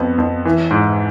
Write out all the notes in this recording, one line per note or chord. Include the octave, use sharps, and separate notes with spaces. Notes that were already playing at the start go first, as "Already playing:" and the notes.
Already playing: F2 B3
F2
E3
G#2